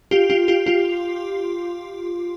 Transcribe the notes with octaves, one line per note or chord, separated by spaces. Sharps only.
F4 G4
F4 G4
F4 G4
F4 G4